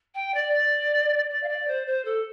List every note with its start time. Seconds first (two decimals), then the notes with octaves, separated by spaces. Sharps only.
0.15 G5
0.34 D5
0.53 D5
1.30 D5
1.43 F5
1.48 D5
1.68 C5
1.87 C5
2.05 A4